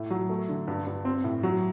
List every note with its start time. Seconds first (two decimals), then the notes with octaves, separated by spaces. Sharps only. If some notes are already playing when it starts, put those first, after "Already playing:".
Already playing: A2 A3
0.11 F#3
0.30 A3
0.49 D3
0.68 G2
0.87 G2
1.05 C4
1.24 A2
1.43 F#3